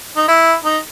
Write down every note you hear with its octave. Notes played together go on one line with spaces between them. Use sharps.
D#4
E4
D#4